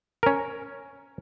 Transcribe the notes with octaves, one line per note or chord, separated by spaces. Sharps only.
C#4 A#4